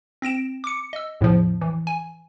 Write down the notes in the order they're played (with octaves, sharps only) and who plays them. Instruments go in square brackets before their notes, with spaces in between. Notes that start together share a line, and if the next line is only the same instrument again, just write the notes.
[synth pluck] C4 A#6 D7 E7
D6 C#7
D#5 E6
E2 A2 C#3 F3
E3
G#5